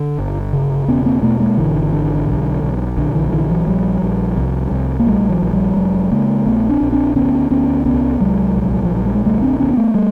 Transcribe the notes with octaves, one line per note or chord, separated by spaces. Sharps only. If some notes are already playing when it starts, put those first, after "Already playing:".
Already playing: D3
G1
C#3
E1 B3 C#4
A#3 C4
B2 A3 B3
G#3 A#3
G#1 D3 E3
D3
B1
B1
A#1 D3
D3 E3
F3
A#1 D3 E3
E3 F#3
A#1 F3 G3
A#1
C2
C2
A#3
A#1 G3 A3
E3 F#3
A#1
F3 G3
F1 F#3 G#3
C#3 G#3 A#3
A#1 A3 B3
C4 D4
A#1
C4 D4
D2 B3 C#4
D2 B3 C#4
C2 B3 C#4
C2 F#3 G#3
A#1
F3
A#1
F#3
G3
G#3
D2 G3 A3
C4 D4
D2 B3 C#4
C4
A3 B3
G3 A3